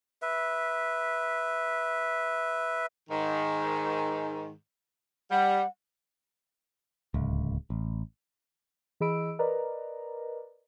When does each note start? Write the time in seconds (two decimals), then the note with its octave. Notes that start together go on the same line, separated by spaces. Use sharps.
0.22 B4 E5
3.10 G#2 D#3
5.31 G3 F#5
7.14 D1 C#2
7.70 A1
9.00 E3 G#4 D#5 B5 E6 D7
9.39 A#4 B4 D5 D#5 A#5